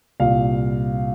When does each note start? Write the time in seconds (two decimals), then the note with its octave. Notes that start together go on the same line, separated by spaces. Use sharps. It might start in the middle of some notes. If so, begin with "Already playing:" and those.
0.20 C2 A#2 G3 F5